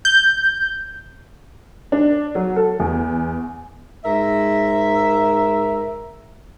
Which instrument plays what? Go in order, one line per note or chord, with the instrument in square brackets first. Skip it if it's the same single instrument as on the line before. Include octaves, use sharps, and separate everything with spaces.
[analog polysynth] G6
[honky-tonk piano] D4
F#3
A4
E2
[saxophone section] G#2 A#4 E5